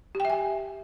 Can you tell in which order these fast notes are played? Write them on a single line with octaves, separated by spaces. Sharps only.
G4 G5 E5 G#5